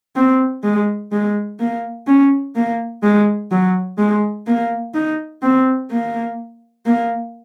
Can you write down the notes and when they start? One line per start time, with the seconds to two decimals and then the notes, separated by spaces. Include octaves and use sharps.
0.16 C4
0.63 G#3
1.12 G#3
1.60 A#3
2.07 C#4
2.55 A#3
3.03 G#3
3.51 F#3
3.98 G#3
4.46 A#3
4.94 D#4
5.42 C4
5.90 A#3
6.86 A#3